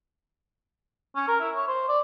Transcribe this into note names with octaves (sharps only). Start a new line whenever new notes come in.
C#4
A#4
E4
C#5
C5
D5